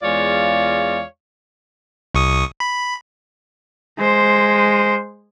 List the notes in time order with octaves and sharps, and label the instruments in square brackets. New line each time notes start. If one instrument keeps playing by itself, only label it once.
[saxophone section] E2 G#3 F4 C#5 D5 F5
[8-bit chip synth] C2 C#6 D#6
B5
[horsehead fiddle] G#3 C5